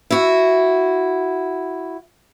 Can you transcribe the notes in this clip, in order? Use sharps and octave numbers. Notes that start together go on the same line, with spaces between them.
E4 F#4